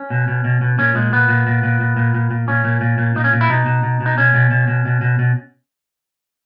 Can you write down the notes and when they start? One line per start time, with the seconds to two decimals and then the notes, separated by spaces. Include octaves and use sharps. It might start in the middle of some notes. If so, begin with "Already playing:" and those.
Already playing: C#4
0.10 B2
0.28 B2
0.44 B2
0.61 B2
0.78 A#2 C#4
0.95 A#2 G#3
1.12 A#2 B3
1.29 A#2
1.47 A#2
1.63 A#2
1.80 A#2
1.97 A#2
2.14 A#2
2.31 A#2
2.48 A#2 C#4
2.64 A#2
2.81 A#2
2.98 A#2
3.16 A#2 D#4
3.24 C#4
3.33 A#2
3.41 E4
3.50 B2 D#4
3.66 B2
3.83 B2
4.01 B2
4.06 D#4
4.17 B2 C#4
4.34 B2
4.51 B2
4.68 B2
4.85 B2
5.01 B2
5.19 B2